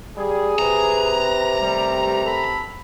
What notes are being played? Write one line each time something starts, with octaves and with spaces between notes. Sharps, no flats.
G3 G#4
C3 B4 A#5
G3 A3 A#4 B4
A4 B5